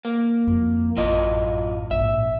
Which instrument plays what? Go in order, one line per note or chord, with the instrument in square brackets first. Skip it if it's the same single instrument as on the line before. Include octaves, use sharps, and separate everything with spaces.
[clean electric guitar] A#3
[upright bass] F2 E3
[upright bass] A1 F#2 [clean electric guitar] F#3 F4 D#5
[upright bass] A#1 G#2 [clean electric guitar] E5